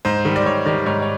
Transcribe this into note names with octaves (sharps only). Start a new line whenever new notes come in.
G#2 C5
D#3 G3
D5
G#2 C#5
D#3 G3 D5
G#2 C#5
C#5